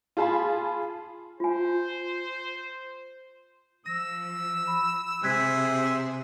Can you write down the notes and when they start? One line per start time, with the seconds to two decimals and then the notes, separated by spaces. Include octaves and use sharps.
0.17 F4 G#4 A5 B5 C6
1.40 F4 C5 G#5
3.86 F3 E6 A#6
4.67 B5
5.23 C3 G#4 C5 E5 F#6 G#6 B6